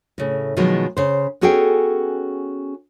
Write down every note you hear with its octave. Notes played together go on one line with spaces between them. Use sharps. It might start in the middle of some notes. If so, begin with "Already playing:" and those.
A2 C#3
B2 D#3 F3 F#3 G#3 B3
C#3 C5
B3 C#4 F#4 G#4 A4 G5